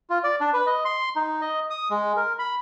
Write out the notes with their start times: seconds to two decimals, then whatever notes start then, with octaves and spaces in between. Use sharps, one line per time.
0.10 F4
0.24 D5
0.41 D4
0.53 B4
0.67 D#5
0.85 C6
1.16 D#4
1.41 D#5
1.70 D#6
1.90 G#3
2.16 A#4
2.39 B5